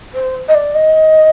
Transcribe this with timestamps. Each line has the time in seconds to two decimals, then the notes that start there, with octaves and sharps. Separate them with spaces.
0.14 C5
0.48 D#5
0.54 D5
0.74 D#5